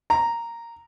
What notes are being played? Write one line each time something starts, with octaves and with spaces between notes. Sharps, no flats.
A#5